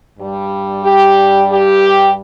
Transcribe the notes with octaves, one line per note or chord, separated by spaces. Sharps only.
G2 G3
G4
G4